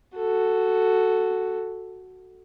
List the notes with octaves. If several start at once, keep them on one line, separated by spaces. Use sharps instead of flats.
F#4 A4